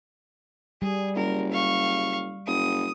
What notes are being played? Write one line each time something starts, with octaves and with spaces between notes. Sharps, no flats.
G3 G#4
F#1 A#4
F5 C#6
F#1 D#6